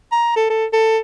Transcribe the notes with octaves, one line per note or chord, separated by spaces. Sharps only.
A#5
A4
A4
A4